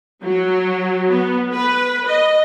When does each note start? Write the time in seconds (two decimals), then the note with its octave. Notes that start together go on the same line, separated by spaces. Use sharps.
0.23 F#3
1.11 B3
1.52 B4
2.07 D#5